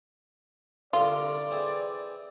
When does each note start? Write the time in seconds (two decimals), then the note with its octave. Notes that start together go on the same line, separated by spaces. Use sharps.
0.93 C2 D3 F4 A#4 D5
1.50 E3 C4 G#4